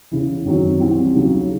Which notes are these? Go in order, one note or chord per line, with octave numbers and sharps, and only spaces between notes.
E2 C#3 E3
F#2 D#3 F#3 C4
C2 C3 E3 C4
D#2 C#3 F#3